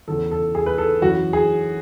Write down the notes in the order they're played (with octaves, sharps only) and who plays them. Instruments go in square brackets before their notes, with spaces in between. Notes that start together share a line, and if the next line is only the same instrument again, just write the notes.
[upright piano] E2 C#3 E3 A4
A4
G#4
B4
A4
F#2 E3 F#4
G#4